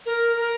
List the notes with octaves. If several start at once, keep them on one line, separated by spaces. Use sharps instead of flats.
A#4
A#4